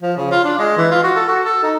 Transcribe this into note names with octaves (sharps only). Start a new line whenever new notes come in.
F3
C#3
F4
D4
G#3
E3
F4
F#4
A4
F#4
A4
D#4